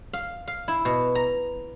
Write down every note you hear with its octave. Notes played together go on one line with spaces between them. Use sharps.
F5
F5
E4
B2
A#5